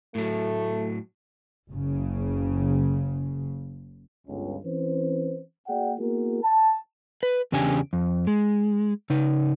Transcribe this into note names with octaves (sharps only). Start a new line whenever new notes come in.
A2 F#3 A3
F#1 C#3
G1 C#2
E3 C4 C#4 B4 C5
A#3 F#4 G#4 D5 F#5 G5
A#3 B3 E4 F#4 G#4 A#4
A5
B4
E2 C#3 D4 G4 G#5
F2
G#3
C#3 D#4